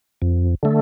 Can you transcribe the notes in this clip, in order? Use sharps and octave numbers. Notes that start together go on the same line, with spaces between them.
F2
D3 A3